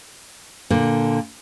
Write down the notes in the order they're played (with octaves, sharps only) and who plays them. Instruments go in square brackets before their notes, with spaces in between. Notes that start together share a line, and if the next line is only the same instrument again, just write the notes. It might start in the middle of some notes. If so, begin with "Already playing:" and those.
[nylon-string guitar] A#2 D3